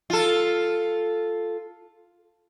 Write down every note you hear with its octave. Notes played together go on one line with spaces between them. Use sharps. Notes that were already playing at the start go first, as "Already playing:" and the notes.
F4 A4